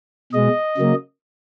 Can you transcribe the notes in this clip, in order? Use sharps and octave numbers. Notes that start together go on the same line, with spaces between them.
B2 G#3 D#5
C#3 F#3 A#3